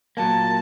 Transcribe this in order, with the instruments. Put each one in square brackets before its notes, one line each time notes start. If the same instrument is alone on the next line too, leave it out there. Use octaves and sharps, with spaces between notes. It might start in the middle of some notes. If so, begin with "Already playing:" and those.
[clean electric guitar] A#2 F#3 A#3 [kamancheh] A5